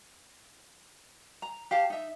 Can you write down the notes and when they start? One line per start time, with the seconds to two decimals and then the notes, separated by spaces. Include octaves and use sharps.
1.42 A#5
1.71 G4 F5 A5
1.90 D#4 E5